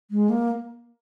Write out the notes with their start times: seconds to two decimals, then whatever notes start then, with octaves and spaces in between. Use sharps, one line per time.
0.11 G#3
0.29 A#3